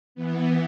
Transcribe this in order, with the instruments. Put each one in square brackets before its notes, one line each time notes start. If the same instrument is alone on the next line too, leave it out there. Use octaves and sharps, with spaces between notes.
[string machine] E3 B3